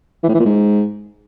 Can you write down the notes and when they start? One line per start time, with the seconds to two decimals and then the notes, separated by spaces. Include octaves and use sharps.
0.23 E3
0.29 A2
0.34 E3
0.40 A#2
0.45 G#2